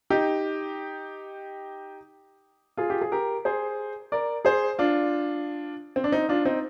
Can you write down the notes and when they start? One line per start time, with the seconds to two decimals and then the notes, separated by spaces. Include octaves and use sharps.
0.10 D#4 G4
2.77 F4 G#4
2.90 G4
3.01 G#4
3.12 G4 A#4
3.45 G#4 C5
4.12 A#4 D5
4.45 G#4 C5
4.79 D4 F4
5.96 C4
6.04 D4
6.12 C4 D#4
6.29 D4 F4
6.45 C4 D#4